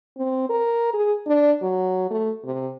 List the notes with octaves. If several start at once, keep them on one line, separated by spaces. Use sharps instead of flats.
C4
A#4
G#4
D4
F#3
A3
C3